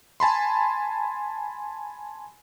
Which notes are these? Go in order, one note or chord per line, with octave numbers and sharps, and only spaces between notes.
G#5 A5 B5 C6